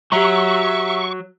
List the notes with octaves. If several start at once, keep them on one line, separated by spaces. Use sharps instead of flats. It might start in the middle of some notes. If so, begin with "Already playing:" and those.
F#3 G4 E5 A#5 C#6